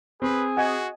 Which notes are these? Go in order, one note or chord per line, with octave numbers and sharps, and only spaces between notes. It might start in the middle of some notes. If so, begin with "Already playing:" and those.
C4 G#4 B4
F#4 D#5 F#5 G#5